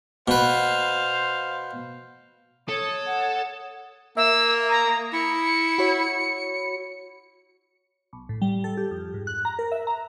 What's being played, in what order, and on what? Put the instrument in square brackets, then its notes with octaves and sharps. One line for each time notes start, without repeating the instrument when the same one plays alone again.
[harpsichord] B2 B4 [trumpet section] C5 F5
[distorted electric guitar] A4 [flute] C#5 [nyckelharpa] D#6
[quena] F#5
[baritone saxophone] A#3 [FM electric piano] E5 [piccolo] E6
[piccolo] A#5 [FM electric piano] D#6 G#6 A#6
[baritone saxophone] E4 [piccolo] C#7
[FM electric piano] F#4 C#5 B5
[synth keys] B1
A2
G3
A4
G4
F2
G#2
F#6
A#5
A#4
E5
A#5